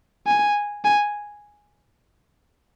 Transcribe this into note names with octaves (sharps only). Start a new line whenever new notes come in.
G#5
G#5